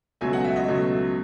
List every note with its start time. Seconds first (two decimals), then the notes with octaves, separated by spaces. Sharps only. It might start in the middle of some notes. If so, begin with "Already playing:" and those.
0.21 C#2 B2 F#3 A3 G#5
0.33 F#5
0.44 E5
0.56 D#5
0.68 C#2 B2 F#3 A3